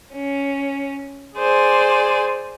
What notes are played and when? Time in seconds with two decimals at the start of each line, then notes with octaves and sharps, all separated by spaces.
0.13 C#4
1.36 G#4 C5 D5 G#5